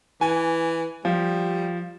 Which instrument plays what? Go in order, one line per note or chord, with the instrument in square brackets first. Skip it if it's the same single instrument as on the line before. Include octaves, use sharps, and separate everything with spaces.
[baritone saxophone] E3 [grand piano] G#5
[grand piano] F3 [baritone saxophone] G3